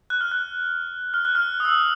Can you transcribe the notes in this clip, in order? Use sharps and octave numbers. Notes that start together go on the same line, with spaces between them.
F#6
F6
F#6
F6
F#6
F6
D#6
E6